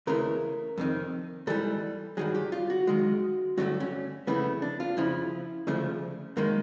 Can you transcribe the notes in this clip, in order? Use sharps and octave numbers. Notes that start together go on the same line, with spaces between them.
D#2 C#3 E3 A3 A#4
F2 C3 D#3
G#2 E3 G3 A4
G2 D#3 F#3 G#4
G4
F4
F#4
F#2 D#3 G#3
G2 D3 F#3 A3 F#4
C#4
F2 C#3 E3 A3 B3
D4
F4
F2 C#3 F3 E4
D2 C#3 F3 A3
F#2 D#3 G#3 A#3